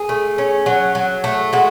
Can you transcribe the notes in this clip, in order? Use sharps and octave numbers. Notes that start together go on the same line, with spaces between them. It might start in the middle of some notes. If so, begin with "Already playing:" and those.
Already playing: G#4
A3
C#4
F#3
F#3
A3
G#3 F#4